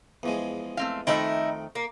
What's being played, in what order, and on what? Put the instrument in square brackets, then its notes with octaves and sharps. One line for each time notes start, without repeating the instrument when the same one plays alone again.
[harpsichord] E2 F3 G#3
[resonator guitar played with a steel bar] A3 C4 F5
[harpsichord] F2 G5 C6 [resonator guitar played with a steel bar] D#3 A3 E5 [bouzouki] D#4 E4
[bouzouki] A#3